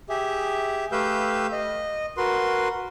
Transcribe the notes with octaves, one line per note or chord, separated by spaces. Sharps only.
G4 G#4 E5
A3 G4 B4 F5 E6 G6
D#5
F#4 A#4 B4 C6